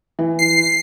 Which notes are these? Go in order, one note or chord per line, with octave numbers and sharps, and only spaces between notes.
E3
C7